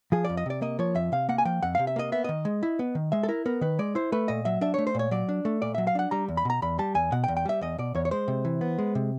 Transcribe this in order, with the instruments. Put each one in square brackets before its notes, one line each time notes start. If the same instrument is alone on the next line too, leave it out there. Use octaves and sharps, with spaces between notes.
[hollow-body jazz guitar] F3 G#4
F2 D5
D#5
C3 D5
A#3 D#5
F3 C#5
F2 E5
C3 F5
A#3 F#5
G#5
F3 G5
F2 F#5
C3 F5
E5
A#3 D#5
B3 E5
D#3 D#5
G#3
E4
B3
D#3
G#3 E5
A4
E4 A#4
B3 A#4
D#3 B4
G#3 D5
E4 C5
A3 B4
A#2 D#5
F#3 E5
D4 E5
A3 C#5
C5
A#2 C#5
F#3 D5
D4
A3
A#2 D5
F#3 E5
F5
D4 F#5
G3 A#5
E2
B5
B2 A#5
E2 B5
G3 A5
E2 G#5
B2 F#5
G5
E2
G5
G3 E5
E2 D#5
B2 D5
E2 C#5
C#5
G#3 C5
C3
E3
B3
G#3
C3